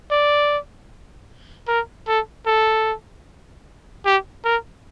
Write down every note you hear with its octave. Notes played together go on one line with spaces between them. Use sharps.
D5
A#4
A4
A4
G4
A#4